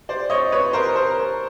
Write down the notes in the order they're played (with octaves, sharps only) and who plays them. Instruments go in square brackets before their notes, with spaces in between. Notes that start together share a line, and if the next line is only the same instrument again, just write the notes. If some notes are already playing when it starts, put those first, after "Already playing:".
[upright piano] C5 D5
C#5 D#5
B4 C#5
A#4 C5
A#4 C5